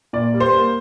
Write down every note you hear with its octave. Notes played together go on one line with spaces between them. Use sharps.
A#2 D5
G3
C5
A#3